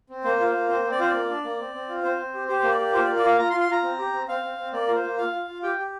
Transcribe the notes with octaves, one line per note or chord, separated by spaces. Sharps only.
C4
A#3 C5
F4
C5
A#3
C4 C5
C4
D5
F4 C5
D5
A#3
D4
A#3
C4
C4
F4
C4 C5
C4
G4
G4 C5
A#3 C5
D5
G4
F4 C5
D5
A#3
D5
F4 F5
F4 A#5
C6
F4
C6
F4 A#5
C4
G4
C4
C4 F5
C4
C4
A#3 D5
F4 A#4
C5
A#3
F4 F5
F4
F4
G4 G5
G4